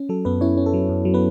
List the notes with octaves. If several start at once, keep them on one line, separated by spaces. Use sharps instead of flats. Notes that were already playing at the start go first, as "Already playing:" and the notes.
Already playing: C#4
F#3 A4
F#2 B3 B4
C#4 E4 C#5
C#4
A4
F#3
F#2
F#3
B3 B4